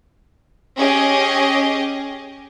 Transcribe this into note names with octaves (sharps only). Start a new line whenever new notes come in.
C#4 G4 G#4 D#5